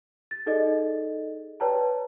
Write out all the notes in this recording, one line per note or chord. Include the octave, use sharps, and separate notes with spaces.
A6
D#4 G#4 A4 D5 D#5
B4 C#5 D5 G5 A5 A#5